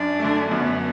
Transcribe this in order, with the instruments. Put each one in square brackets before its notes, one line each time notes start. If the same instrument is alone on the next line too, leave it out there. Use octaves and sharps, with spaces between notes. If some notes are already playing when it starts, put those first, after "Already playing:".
Already playing: [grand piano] F#2 [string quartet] D4
[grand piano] D3 A3
[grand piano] F#2 [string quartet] B3